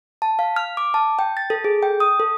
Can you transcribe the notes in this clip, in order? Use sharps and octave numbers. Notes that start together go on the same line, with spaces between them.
A5
F5
F6
D6
A5
G5
A6
A4
G#4
G5
D#6
A4